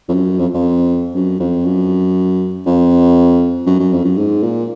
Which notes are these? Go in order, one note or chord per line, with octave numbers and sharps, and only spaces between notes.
F2
F#2
F2
F2
F#2
F2
F#2
F2
F#2
F#2
F2
F#2
G#2
A#2